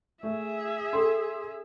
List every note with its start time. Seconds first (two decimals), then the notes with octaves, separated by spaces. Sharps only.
0.23 A3 G#4 E5
0.93 C#4 G4 A4 C6